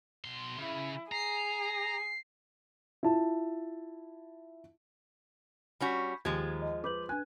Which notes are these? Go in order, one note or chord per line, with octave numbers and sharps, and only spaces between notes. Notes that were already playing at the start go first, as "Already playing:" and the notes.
B2 C6
C#3 E4
G#4 A#5 C7
E4 F4 A5
G3 C#4 F#4 B5 G6 B6
D#2 F3 G#3 G#6
D#5
B4 D6 G6 F#7
D4 B4 G#5 F#6